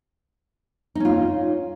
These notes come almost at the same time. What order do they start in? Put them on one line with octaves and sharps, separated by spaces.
D#4 C#4 F4